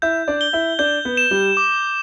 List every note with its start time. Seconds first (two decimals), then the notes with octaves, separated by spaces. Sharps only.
0.02 E4 E5 G6
0.28 D4 D5
0.41 G7
0.53 E4 E5
0.79 D4 D5 G6
1.05 B3 B4
1.17 E7
1.31 G3 G4
1.57 D6